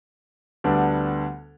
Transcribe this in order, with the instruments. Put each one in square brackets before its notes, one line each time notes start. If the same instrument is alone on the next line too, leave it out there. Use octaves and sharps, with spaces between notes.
[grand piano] D2 D3 G3 B3 D4